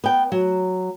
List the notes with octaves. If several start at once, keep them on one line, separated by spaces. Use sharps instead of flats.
B3 G5
F#3